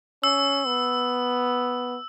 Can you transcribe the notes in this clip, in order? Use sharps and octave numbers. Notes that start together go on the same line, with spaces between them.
C#4 E6
B3